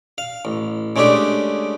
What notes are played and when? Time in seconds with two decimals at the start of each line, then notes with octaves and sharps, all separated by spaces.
0.18 F5
0.45 A1
0.96 C#3 G#3 A3 D4 G4